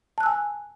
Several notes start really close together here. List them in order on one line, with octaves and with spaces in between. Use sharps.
A5 F#6 E6 G#5